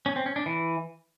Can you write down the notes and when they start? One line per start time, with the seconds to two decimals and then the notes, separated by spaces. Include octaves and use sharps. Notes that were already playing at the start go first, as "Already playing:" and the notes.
0.06 C#4
0.16 C4
0.26 C#4
0.36 D4
0.46 E3